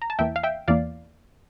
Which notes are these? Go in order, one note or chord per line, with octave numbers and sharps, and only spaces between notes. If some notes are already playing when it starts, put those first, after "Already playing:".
A#5
A5
E2 E3 A#3 E5 G5
F5
E5 G5
E2 E3 A#3 D5 F5